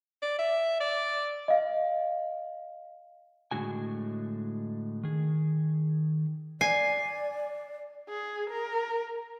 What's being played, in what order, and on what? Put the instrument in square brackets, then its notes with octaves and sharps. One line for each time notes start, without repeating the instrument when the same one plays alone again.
[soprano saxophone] D5
E5
D5
[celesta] D#5 F5
[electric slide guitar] A2 D3 G#3 F#4 G#5
D#3 G#4
[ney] D5 [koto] G#5 [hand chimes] C7
[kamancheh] G#4
A#4